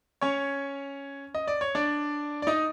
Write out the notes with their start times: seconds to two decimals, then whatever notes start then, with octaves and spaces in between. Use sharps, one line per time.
0.21 C#4 C#5
1.35 D#5
1.48 D5
1.61 C#5
1.75 D4 D5
2.42 D5
2.47 D#4 D#5